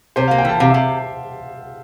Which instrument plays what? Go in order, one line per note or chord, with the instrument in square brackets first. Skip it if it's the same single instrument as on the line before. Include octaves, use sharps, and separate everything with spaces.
[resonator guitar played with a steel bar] C3 [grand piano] C5
[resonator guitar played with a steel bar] A#3 [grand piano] F5
[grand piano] G5
[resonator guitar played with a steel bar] E3 [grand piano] A5
[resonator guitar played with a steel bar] C3 [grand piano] F5
[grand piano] E5
[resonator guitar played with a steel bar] C3